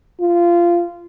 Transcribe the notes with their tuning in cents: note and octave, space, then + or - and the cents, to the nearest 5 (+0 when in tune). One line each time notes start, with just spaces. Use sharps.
F4 -15